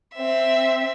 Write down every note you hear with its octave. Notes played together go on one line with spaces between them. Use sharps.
C4 E5